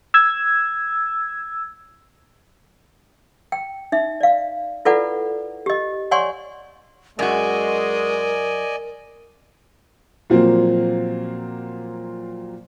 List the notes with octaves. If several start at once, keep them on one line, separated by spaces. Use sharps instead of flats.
E6 G#6
G5
D#4 E5
D5 F5
E4 F4 A4 B4 D5 F#5
G4 D#5
C#5 D5 F#5 G#5 C6 C#6
F#2 G#3 F#4 A#4 D5 D#5 G#5
A#2 F3 F#3 A#3 C4